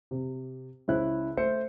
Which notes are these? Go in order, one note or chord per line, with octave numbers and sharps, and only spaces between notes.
C3
C#2 C#4 E4 C5 F#6
A3 C5 E5 C#7